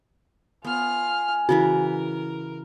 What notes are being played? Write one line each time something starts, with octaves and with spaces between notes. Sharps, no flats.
B3 F4 G#5 F6
C#3 E3 F#4 A#4 B4